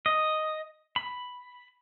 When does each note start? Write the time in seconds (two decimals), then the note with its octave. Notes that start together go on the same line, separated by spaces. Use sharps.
0.06 D#5
0.96 B5